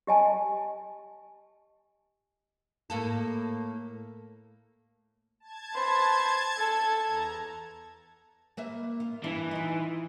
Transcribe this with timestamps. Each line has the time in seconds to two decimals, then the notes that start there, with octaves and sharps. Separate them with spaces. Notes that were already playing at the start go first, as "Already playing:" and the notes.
0.07 G4 D#5 G#5 A5
2.90 A2 A#3 A4
5.40 A5 G#6
5.74 B4 C5
6.58 A4
7.06 E2 A#5
8.57 A#3 B4 E5
9.00 F4
9.24 G2 E3 D4 E4
9.51 D#4 F4